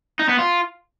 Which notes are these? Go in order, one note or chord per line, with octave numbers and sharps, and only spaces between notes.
D#4
B3
F4